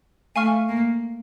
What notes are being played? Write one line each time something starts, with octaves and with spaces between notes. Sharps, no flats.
A3 F5 G#5 C#6 F6
A#3